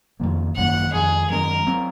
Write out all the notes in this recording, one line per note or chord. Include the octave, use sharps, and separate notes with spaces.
F2 D#3 A#3
G#1 F#2 D#3 A#3 F#5
F2 D#3 G#3 G#4
F#2 D#3 G#3 A#4
F#3 C4